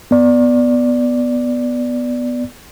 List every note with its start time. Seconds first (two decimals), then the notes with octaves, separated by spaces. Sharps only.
0.11 B3 D5